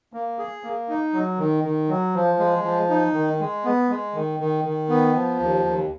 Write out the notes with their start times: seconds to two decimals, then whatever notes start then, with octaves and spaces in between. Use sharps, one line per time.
0.13 A#3
0.39 G#4
0.64 A#3
0.89 D#4
1.13 F#3
1.39 D#3
1.64 D#3
1.89 F#3
2.14 F3
2.39 G#3
2.64 F3
2.89 D#4
3.14 D#3
3.40 G#3
3.64 B3
3.90 G#3
4.14 D#3
4.40 D#3
4.64 D#3
4.89 B3
5.14 F3
5.40 D#2
5.65 D#2